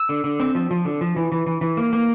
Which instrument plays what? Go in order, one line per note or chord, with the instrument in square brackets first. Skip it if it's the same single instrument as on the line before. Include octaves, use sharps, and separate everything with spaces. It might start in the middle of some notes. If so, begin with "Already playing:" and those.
Already playing: [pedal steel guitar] E6
D3
D3
C4
F3
F3
D3
F3
E3
E3
E3
E3
A#3
A#3